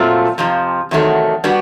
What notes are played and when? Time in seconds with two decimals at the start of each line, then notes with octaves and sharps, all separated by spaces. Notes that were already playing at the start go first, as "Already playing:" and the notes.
Already playing: A#2 F#3 A3 C4 F4
0.38 F2 C3 F3
0.91 E2 C3 D#3 F#3 A3
1.44 G3 B3 D4 F#4